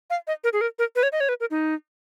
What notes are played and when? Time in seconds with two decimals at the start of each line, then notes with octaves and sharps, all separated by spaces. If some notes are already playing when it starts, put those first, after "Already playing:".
0.10 F5
0.27 D#5
0.44 A#4
0.53 G#4
0.61 A#4
0.79 A#4
0.96 B4
1.03 C#5
1.12 D#5
1.20 C#5
1.29 B4
1.40 A#4
1.51 D#4